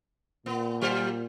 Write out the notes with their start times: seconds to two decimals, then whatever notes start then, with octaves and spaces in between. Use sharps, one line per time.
0.46 A#2 B3
0.81 F#3 G4 C5